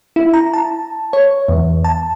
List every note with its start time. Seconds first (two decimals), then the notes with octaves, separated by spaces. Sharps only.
0.16 E4
0.34 A#5
0.53 A5
1.13 C#5
1.48 E2
1.84 A5